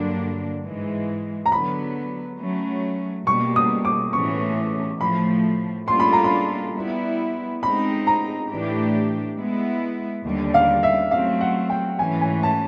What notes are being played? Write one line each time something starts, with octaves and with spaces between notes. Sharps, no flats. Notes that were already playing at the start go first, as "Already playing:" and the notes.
Already playing: G2 D3 F#3 A#3 D4
G#2 E3 G#3
A#5
D3 F#3 B3 B5
F#3 A3 C#4
B2 G3 A#3 C#6
D#6
D6
A2 E3 A3 C#4 C#6
A2 F3 A3 B5
G3 A#3 D4 F4 A4 C6
B5
A#5
B5
G3 B3 E4
G#3 C4 D#4 B5
A#5
A2 E3 A3 D4 G4
G#3 B3 E4
D#2 D3 G3
F5
E5
F#3 A3 C4 F5
F#5
G5
G#2 E3 A3 C#4 G#5
G#5
A5